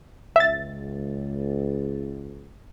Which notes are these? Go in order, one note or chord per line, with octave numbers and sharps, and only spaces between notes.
C#2 E5 A6